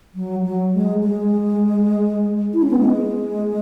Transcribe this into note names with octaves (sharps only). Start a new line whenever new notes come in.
F#3
F#3
G#3
G#3
E4
C#4
B3
G#3